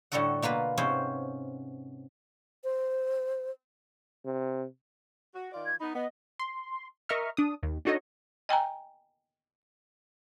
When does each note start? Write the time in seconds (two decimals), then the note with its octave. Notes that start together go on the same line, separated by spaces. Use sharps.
0.12 A2 D3 G3 F#4 A4 F#5
0.42 B2 A#3 F4 B4
0.77 G#2 C3 B3 C#4 C5
2.64 C5
4.25 C3
5.34 F#4
5.52 D#3 F4 D5
5.66 G#6
5.80 B3 D#4 B5
5.95 B3 D#5
6.39 C6
7.09 A#4 D#5 E5 A#5 C#6 F6
7.37 D4 D#6
7.63 D#2
7.85 D4 D#4 F#4 A4 C#5 D#5
8.49 D#5 G5 G#5 A#5